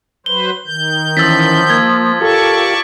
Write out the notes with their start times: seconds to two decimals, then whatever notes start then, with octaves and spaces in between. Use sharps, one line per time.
0.26 F#3 B4 C5 G7
0.66 D#3 G6
1.17 E3 F3 C#4 E6 A6 B6
1.70 A#3 G#6
2.21 F4 G4 A4 A#4 D5 A5 C#6